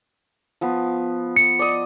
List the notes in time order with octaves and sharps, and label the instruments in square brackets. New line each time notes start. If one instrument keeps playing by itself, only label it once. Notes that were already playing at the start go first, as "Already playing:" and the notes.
[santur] F3 B3
[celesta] C#7
[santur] D5 D#5